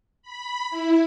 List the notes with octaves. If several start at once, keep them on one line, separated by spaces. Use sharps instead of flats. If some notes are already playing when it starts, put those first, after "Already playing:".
B5
E4